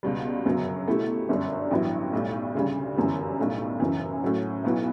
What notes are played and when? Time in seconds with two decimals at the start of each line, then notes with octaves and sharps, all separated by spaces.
0.03 C#2 B2 G3
0.45 G1 F#2 C#3 F#3 B3
0.87 B2 A3 E4 G4
1.29 G1 F#2 D3 G3 D4
1.71 A1 G2 F#3 B3 E4
2.13 B1 A2 G3
2.55 D2 C#3 G3
2.96 G1 F#2 E3 G3
3.38 B1 A2 G3
3.80 F#1 F#2 E3
4.22 A2 F#3 C#4 F#4
4.64 B1 B2 F#3 B3 E4